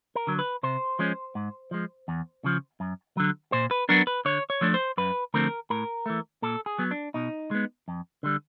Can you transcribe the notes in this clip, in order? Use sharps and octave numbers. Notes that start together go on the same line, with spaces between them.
A#4
D3 F#3
B4
C3 C5
F3 G#3 C#4
G#2
F3 G#3
E2
C#3 F3
F#2
D3 F#3
A#2 C5
B4
F#3 B3 D4 A#4
B4
D3 C#5
C#5
F3 A3 D4
C5
F#2 B4
D3 F3 A3 C4 A#4
A2 A#4
E3 A3
A#2 A4
G#4
F#3 B3
D4
B2 D#4
G#3 B3
F2
D3 G3